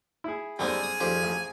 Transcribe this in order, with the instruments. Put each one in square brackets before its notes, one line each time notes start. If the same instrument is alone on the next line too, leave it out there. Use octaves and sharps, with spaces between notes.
[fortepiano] E4 G#4
[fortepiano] F#2 D#4 A4 [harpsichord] G3 B3 C4 [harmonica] G#4 G#5
[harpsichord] D#6
[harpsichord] F2 G4 C5 [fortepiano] D#3 G3
[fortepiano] A1 D#6